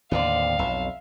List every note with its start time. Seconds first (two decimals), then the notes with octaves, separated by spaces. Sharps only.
0.11 D#2 A2 D3 B3 C4 D5 F5
0.59 B1 F2 E5